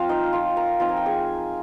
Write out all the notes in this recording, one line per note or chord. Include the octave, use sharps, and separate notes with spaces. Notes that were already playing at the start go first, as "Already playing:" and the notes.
Already playing: F3 C4 F4 F5
D#4 D#5
F4 F5
A#4 A#5
F3 C4 D#4 A#5
G#5
G5
G#4 G#5